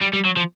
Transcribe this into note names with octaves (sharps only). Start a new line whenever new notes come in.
G3
G3
F#3
F3